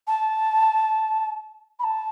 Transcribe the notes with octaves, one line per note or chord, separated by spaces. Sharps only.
A5
B5
A5